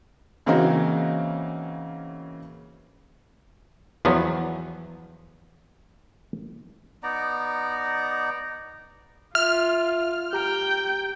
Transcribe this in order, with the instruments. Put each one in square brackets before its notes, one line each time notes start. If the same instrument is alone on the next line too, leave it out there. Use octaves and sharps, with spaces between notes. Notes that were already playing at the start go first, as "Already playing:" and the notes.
[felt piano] C#3 E3 A#3 C4 D#4 F#4
[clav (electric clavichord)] E2 F3 F#3 B3
[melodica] B3 D#4 D5 A#5
[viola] F4 [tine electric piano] E5 [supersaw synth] F6
[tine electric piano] G4 A#5 [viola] G5